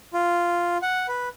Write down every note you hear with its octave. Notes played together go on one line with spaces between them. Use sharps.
F4
F#5
B4